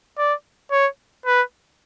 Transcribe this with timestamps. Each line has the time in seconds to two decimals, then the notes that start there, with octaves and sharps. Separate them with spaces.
0.18 D5
0.71 C#5
1.26 B4